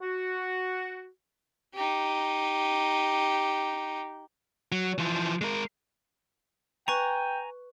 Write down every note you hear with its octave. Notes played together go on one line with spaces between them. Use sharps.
F#4
D#4 G4
F#3
E3 F3
G#3 A#4
B4 G5 G#5 A#5 C#6